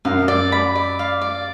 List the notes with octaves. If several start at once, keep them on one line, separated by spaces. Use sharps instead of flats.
F#2 F5
D5
B5
D5
F5
D5